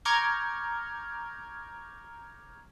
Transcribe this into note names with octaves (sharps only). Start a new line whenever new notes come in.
A#5 C#6 D6 F6 G6 G#6